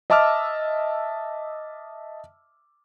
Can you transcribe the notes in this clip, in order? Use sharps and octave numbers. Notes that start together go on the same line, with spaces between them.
D#5 E5 A5 D6 E6 F6